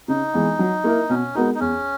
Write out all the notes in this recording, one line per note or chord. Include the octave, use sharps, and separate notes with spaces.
C#3 D#4
E3 G#3 B3
F#3
A#3 E4 A#4
B2 C#4
G#3 B3 D#4 F#4 A#4
D#4
E2 C#4